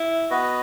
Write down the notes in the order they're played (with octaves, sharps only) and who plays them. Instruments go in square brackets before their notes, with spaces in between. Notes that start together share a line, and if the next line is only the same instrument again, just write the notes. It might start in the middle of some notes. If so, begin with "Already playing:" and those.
Already playing: [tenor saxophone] E4
[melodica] B3 F#4 B4 D#5